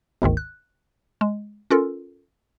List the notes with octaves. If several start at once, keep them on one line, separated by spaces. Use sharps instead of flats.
G1 D2 G#2 D#3
F#6
G#3
C#4 F4 A4 A#4